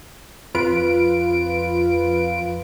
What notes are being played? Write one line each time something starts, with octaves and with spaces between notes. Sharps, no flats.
F2 F4 B4 D7